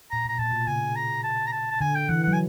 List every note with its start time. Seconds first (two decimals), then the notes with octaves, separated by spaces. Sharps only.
0.11 A#2 A#5
0.25 B2
0.28 A#5
0.39 A#2 A5
0.53 B2
0.67 C#3 G#5
0.96 A#5
1.23 A5
1.47 A#5
1.52 A5
1.71 A5
1.81 D3 G#5
1.95 G5
2.09 E3 F#5
2.23 F#3 F#5
2.33 G#5